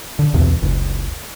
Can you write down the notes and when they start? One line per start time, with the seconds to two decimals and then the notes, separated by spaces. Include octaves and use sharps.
0.19 D3
0.33 D1 B1 E2 C3
0.62 F#1 C#2